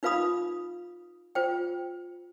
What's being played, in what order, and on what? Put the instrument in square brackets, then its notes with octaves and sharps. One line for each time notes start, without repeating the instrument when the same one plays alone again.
[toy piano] D#4 F4 B4 F5 B5 D#6
F4 C5 G5